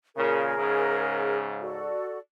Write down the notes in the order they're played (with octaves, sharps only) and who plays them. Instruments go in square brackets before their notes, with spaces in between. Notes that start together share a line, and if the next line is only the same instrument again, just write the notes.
[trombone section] A#2 C#3 [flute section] G#4 A#4
[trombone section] G#2 C#3
[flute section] F#4 A4 D5